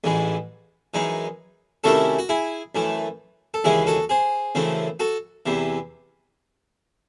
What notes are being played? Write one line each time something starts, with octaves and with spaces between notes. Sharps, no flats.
A1 G#2 E3 G#3
F#2 E3 G#3 D#4
C3 D#3 A3 C#4 E4 F#4 A4
F#4
E4 G#4
F#2 E3 A3
A4
D#2 C#3 E3 G#3 E4 G#4
F#4 A4
G#4 C5
F#2 C#3 E3 A3 C4
F#4 A4
E2 C3 E3